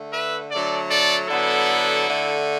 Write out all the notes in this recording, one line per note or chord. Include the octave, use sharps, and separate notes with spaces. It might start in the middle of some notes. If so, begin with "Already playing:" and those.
Already playing: D3 A3
B4 E5
D3 F#3 A3 A4 D5
A4 D5
D3 F#3 B3 E4 A4
D3 A3